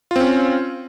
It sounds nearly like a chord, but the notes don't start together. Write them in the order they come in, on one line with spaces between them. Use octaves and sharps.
F4 C4 C#4